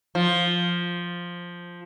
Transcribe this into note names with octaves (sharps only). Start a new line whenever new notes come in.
F3